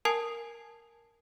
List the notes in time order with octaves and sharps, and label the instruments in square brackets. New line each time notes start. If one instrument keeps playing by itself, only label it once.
[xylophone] A#4 G#5 A5 D#6 G#6 C7